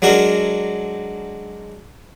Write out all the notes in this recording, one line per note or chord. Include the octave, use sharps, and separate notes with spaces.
F#3 G#3 D4 F#4 A#4